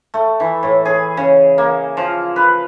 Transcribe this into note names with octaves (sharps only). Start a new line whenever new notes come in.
A3
E3
A2
G#4
C#3
A#3
F3
B4